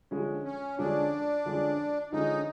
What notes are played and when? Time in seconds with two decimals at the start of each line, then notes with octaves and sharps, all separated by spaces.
0.11 D3 F3 G#3 C#4
0.45 C#4
0.78 D3 F3 G#3 C#4 D4
1.45 D3 F3 G#3 C#4
2.12 D3 F3 G#3 C#4 D#4